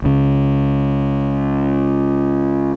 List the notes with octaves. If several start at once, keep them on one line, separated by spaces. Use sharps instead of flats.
C#2 C#3